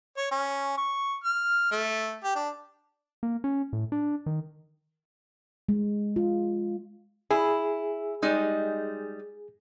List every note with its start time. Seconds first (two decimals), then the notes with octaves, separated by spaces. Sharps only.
0.17 C#5
0.31 C#4
0.78 C#6
1.24 F6
1.71 A3
2.24 G4
2.35 D4
3.23 A#3
3.44 C#4
3.73 A2
3.92 D4
4.26 D#3
5.69 G#3
6.16 F4
7.31 E4 G#4
8.23 G3 G#3 D#4